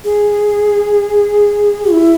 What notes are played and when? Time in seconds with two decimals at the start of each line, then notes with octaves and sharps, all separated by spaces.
0.05 G#4
1.92 E4